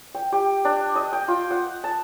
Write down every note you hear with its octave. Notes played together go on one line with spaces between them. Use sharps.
G5
G4
D4
D#5
G5
F4
F#5
A5